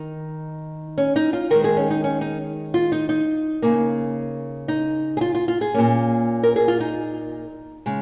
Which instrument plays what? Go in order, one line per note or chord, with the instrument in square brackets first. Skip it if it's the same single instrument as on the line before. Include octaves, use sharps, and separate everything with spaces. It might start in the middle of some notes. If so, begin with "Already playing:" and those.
Already playing: [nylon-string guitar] D#3 D#4
C#4
D#4
F4
D#3 G#3 A#4
G#4
C#4
D#4
C#4
D#4
F4
D#4
D#4
C#3 A#3
D#4
G#4
F4
F4
F4
G#4
A#2 A#3 C#4
A#4
G#4
F4
D#4
C#3 G#3